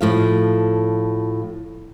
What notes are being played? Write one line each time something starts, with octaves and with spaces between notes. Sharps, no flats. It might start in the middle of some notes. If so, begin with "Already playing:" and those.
A2 F3 F5